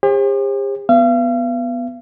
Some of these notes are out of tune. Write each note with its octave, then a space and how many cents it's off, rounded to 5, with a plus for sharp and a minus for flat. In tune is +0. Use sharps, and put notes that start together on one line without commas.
G4 +45 C5 +40
B3 +0 F5 -40